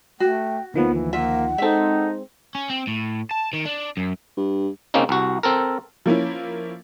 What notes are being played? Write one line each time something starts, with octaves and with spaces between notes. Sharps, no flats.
A3 F#4 G5
D2 D#3 F3 A#3 B3
E3
A#3 F4 E5 F#5
G#3 C4 D#4 A4 E5
C#4
C4
A2
A5
D#3
D4
F#2
G2
C#3 A#3 C4 C#4 D#4
C2 F#4
C4 A4 A#4
F3 A#3 C#4 E4